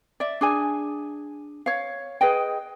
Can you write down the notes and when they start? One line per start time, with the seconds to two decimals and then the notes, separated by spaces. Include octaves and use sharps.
0.20 D5 E5
0.41 D4 G#4 G#5
1.66 C#5 F5
2.21 G#4 B4 D#5 G5